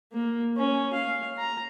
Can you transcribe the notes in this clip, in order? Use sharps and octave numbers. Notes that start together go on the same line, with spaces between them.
A#3
C#4
F5
A#5